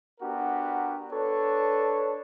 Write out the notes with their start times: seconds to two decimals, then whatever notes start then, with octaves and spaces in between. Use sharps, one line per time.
0.21 B3 D4 F#4 G4 A#4
1.12 D4 A4 B4 C#5